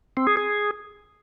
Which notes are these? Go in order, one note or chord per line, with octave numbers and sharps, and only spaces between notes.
C4
G#4
G#4